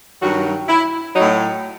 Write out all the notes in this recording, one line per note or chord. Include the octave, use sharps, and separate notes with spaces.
G2 D#3 F#3 F#4
E4
A2 F#3 D#4